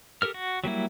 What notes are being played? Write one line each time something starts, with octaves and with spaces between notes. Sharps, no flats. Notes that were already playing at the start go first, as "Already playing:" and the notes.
G4 A4 A#4 F6
F#4
F#3 G3 A#3 E4